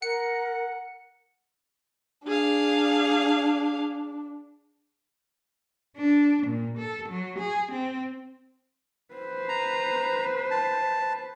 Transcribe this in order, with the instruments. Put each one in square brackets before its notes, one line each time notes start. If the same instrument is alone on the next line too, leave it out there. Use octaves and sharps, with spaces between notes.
[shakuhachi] A#4 [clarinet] F#5 [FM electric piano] C#7
[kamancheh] D4 [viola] G#4 F5
[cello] D4
A#2
A4
F#3
G#4
C4
[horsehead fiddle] B4 C5
[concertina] A#5
A5